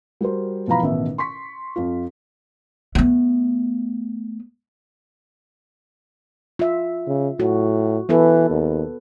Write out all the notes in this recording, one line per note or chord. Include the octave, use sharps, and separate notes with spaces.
G3 F#4 A#4 C5
B2 E3 F3 F5 A#5 B5
A1 B2 D#3 E5
C6 C#6 B6
F2 F4
A3 B3
F4 E5
C#3
A2 F#4
E3 B3 A4 B4
D#2